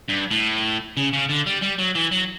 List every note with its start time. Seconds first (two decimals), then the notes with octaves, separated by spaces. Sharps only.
0.09 G2
0.31 A2
0.97 C#3
1.13 C#3
1.29 D3
1.46 G3
1.62 G3
1.79 F#3
1.95 E3
2.12 F#3